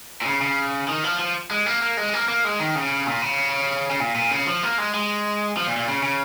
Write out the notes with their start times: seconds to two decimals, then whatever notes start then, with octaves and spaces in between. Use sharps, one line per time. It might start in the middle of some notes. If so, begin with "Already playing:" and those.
0.22 A#2
0.26 C#3
0.41 C#3
0.88 D#3
1.04 F3
1.19 F3
1.51 G#3
1.66 A#3
1.82 A#3
1.97 G#3
2.14 A#3
2.28 A#3
2.45 G#3
2.60 D#3
2.75 C#3
3.07 A#2
3.22 C#3
3.90 C#3
4.00 A#2
4.15 A#2
4.31 C#3
4.47 F3
4.63 A#3
4.78 G#3
4.94 G#3
5.57 F3
5.67 A#2
5.77 A#2
5.88 C#3
6.03 C#3